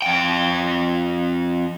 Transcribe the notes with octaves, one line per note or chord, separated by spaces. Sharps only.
F2 G5